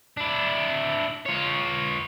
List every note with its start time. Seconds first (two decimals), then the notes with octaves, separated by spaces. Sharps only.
0.17 D4 E4
1.26 F4 C#5